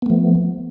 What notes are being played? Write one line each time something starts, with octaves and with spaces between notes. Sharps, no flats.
F3 A3 B3